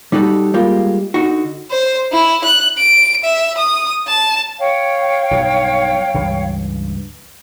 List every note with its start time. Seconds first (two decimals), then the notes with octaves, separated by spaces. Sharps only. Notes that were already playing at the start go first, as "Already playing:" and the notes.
0.12 G3 D#4 F#4 G4 A4
0.54 G3 G#3 A#3 F4 G4
1.14 D3 D#4 F#4
1.71 C5
2.12 E4
2.44 F#6
2.78 D7
3.24 E5
3.58 D#6
4.08 A5
4.59 C#5 F5 G5
5.31 B1 G2
6.14 C#2 G2 E3